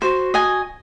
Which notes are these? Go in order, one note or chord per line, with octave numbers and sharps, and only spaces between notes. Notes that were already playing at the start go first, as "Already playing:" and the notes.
F#4 C5
D#5 G#5